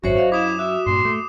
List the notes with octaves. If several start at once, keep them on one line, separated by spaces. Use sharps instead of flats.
G#1 F#2 F#4 C5 C#5 E5
F#2 D#5 F5
E4 D6 D#6 E7
F#4 E5
G2 A#2 C6
A3